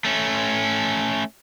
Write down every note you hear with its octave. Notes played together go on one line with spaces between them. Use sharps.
A3 C#4